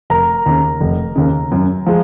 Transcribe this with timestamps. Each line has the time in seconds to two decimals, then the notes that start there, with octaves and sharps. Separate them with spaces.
0.10 F1 A#4 A#5
0.46 D#2 C#3
0.80 F1
1.16 D#2 C#3
1.51 F#2
1.86 F3 G#3